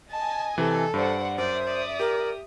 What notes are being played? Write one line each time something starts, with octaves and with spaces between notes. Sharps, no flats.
D#5 G#5 A5
C3 E3 A4
G2 C5 D5 F#5
F#2 C5 D5 E5 D#6
D5
G4 A#4